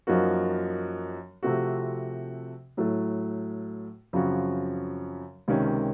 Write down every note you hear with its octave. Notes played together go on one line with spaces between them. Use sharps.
F#2 F3 A#3 D#4 F#4
C3 F3 A3 C4 F#4
A2 F#3 A3
F#2 C#3 F3 C4 F#4
C#2 C3 D#3 A#3 C#4